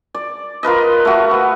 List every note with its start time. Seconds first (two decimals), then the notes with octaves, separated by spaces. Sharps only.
0.15 D5
0.63 F4 A#4 B4 D#5
1.05 A3 F#4
1.31 B4